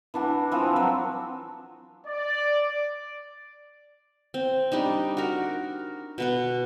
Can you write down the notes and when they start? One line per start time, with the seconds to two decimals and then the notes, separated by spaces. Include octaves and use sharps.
0.14 E3 D4 F#4
0.52 E3 F3 C4
0.76 F#3 C4 D4 C#5
2.07 D5
4.34 C4
4.72 G3 D4 D#4
5.17 F#4 A#4
6.18 B2 B3 B4